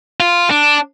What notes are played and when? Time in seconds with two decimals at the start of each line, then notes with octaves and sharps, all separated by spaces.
0.20 F4
0.51 D4